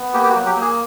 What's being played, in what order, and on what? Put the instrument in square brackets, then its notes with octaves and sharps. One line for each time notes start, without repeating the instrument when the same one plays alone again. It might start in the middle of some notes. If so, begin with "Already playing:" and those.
Already playing: [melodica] B3
A#3 G4
G4
F#4
F#3
G4
A#3
G#4